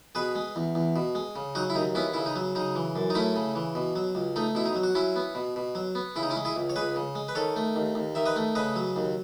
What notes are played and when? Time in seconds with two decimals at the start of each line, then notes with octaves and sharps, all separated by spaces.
0.15 B2 G#4 B4
0.35 G#3
0.56 E2
0.75 E2
0.96 B2
1.15 G#3
1.36 C#3
1.55 F#3 D#4 F#4
1.70 E4
1.75 D#2 D#4
1.95 B3 C#4 E4
2.14 C#3 E4
2.26 D#4
2.36 F#3
2.55 C#3 D#4
2.76 E3
2.96 F#2
3.10 D#4
3.15 A3 C#4 E4
3.36 C#3
3.55 E3
3.75 B2
3.95 F#3
4.15 C#2
4.36 A3 D#4
4.55 B2 E4
4.66 D#4
4.75 F#3
4.83 F#4
4.95 F#3 C#4 E4
5.16 B3
5.35 B2
5.56 B2
5.75 F#3
5.95 B3
6.16 C#3 E4
6.23 D#4
6.30 C#4 E4
6.36 G#3
6.45 E4 G#4
6.56 C#2
6.70 C#5
6.76 C#2 G#4 B4
6.96 C#3
7.15 G#3
7.28 B4
7.35 D#3 A4 C#5
7.56 A3
7.76 D#2
7.95 D#2
8.15 D#3 E5
8.26 B4 D#5
8.36 A3
8.55 C#3 B4 D#5
8.76 F#3
8.96 D#2